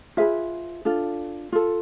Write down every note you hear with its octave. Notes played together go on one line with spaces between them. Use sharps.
F4 G#4 B4 E5
D4 F4 A4
F4 A4